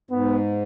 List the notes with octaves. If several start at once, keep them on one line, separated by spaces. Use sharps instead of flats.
G#2 B3